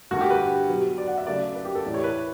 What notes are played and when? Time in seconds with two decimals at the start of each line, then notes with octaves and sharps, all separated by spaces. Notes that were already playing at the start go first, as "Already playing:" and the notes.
0.11 G2 D3 A3 F#4
0.21 G4
0.30 B4
0.69 B2 F#3 B3
0.98 D5
1.07 F#5
1.17 E5
1.27 C#3 F#3 A3 D5
1.55 B4
1.65 G4
1.75 A4
1.85 A2 E3 A3 D5
1.94 C#5
2.04 B4